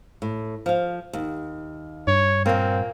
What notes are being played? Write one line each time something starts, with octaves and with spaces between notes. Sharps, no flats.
A2
F3 F5
D#2
G2 C#5
A#2 A#3 C4